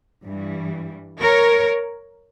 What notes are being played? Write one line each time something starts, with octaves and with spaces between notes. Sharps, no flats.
G2 E3 G3
A#4 C#5